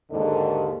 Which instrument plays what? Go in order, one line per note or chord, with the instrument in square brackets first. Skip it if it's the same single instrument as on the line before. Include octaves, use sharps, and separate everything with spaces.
[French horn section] D#2 G#2 D3 A4 D#5